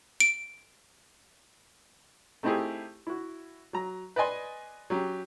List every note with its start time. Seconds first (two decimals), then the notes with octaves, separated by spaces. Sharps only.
0.20 D7
2.43 A3 C4 D#4 E4 G4 G#4
3.07 E4 F#4
3.73 F#3 A#5
4.16 B4 D5 D#5 G#5 C6
4.90 F#3 C#4 G4